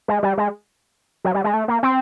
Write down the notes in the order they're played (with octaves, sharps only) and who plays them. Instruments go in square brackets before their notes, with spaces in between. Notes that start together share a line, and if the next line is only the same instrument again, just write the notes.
[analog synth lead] G#3
G3
G#3
F#3
G3
G#3
A3
A#3
C4